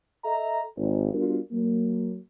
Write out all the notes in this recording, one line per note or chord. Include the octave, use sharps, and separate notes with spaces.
A4 D#5 E5 A#5
G#1
G3 B3 D4 F4 F#4 A#4
F#3 A#3